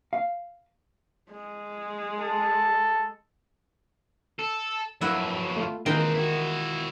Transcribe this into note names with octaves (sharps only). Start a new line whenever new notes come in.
F5
G#3
A4
A4
F2 F#3 E4 B4 F#5
A3 F4
D#3 E3 G#3 C4 F4 B4 G5 A#5
E4 F#4